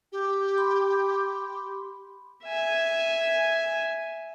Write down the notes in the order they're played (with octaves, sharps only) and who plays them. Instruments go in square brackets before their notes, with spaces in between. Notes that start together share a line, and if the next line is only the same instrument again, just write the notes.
[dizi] G4
[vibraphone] B5 C6
[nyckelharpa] E5 G#5